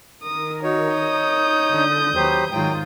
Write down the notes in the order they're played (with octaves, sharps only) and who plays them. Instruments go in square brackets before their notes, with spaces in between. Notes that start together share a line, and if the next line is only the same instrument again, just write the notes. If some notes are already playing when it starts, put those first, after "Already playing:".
[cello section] D#3 A#4 [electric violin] D#6
[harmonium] D#4 C#5 [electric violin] F#4
[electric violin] D#6 G6
[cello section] D3
[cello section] D#2 B4 [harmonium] F#3 G4 C5
[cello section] G#2 D#3 F4 [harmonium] F#3 G5